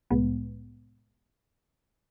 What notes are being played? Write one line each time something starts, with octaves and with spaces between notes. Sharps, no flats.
C2 A2 G#3 B3